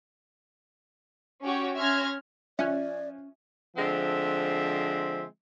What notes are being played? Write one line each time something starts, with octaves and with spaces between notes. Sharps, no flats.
C#4 F#4 G4 C#5 G5
C#4 E5 C6 F6 G#6 A#6
F3 C#4 D5 E5 G#5 F#6
D3 F3 G#3 C4 E5